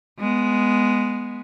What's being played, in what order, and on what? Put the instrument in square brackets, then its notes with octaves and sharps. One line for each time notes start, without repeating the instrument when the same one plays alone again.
[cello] G#3 B3